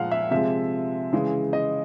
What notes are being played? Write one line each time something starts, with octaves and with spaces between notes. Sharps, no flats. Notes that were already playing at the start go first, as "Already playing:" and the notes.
Already playing: A#2 F3 G#3 F5 F#5
E5
C3 F3 G#3 E5
C#3 E3 G#3
D#5